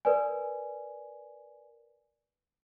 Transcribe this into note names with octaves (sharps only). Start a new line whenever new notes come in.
A#4 B4 D5 G#5